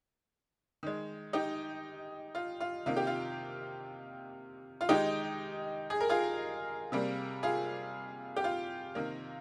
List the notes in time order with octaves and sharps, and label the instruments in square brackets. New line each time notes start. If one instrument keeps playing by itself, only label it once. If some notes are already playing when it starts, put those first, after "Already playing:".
[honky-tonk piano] D#3 G#3
D#4 G4
F4
F4
C3 D#3 A#3 F4
G4
F4
F4
D#3 G#3 D#4 G4
G#4
A#4
F4 G#4
C3 G3 A#3
F4 G#4
G4
F4
C3 D#3 A#3